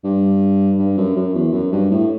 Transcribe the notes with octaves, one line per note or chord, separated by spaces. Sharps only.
G2
G2
F#2
F#2
E2
F#2
G2
A2